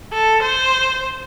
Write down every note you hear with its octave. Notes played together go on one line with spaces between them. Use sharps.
A4
C5